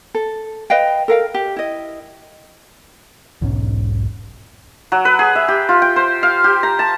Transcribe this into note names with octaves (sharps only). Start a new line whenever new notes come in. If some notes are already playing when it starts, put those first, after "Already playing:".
A4
B4 D#5 F5 G5
A4 A#4 F5 G5
G4
E4 D#5
E1 B1 G#2 C#4
F#3
B4
G#4
E5
G4
F4
G5
C5
F5
G4
A#5
A5